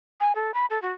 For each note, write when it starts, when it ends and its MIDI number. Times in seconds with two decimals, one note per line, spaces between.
0.21 0.33 80
0.35 0.54 69
0.54 0.66 83
0.70 0.81 69
0.82 0.92 66